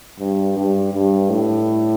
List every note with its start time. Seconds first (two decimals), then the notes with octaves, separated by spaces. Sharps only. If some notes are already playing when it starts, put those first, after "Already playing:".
0.19 G2
0.56 G2
0.94 G2
1.29 A2